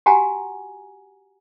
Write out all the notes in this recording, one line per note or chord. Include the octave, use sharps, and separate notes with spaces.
F#4 G4 F#5 G#5 A#5